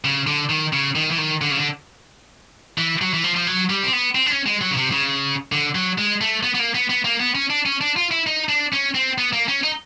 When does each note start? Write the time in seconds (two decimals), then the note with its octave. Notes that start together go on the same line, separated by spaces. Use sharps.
0.04 C#3
0.27 D3
0.49 D#3
0.73 C#3
0.96 D#3
1.11 E3
1.18 D#3
1.41 D3
1.51 C#3
1.57 D3
2.78 E3
3.02 F#3
3.14 E3
3.24 F3
3.36 F3
3.47 F#3
3.70 G3
3.83 C4
3.93 B3
4.15 C4
4.26 D4
4.30 C#4
4.46 G#3
4.61 F#3
4.71 C#3
4.77 C3
4.92 C#3
5.52 D3
5.75 F#3
5.98 G#3
6.21 A3
6.43 B3
6.55 B3
6.59 A#3
6.75 B3
6.89 B3
7.05 A#3
7.20 B3
7.35 C#4
7.50 D4
7.66 C#4
7.81 D4
7.96 F4
8.11 E4
8.27 D#4
8.49 D4
8.73 C#4
8.95 C4
9.18 B3
9.33 A#3
9.48 C#4
9.64 D#4